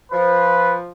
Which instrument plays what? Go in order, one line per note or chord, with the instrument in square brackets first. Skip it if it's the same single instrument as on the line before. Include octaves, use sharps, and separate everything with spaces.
[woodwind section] F3 [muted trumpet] B4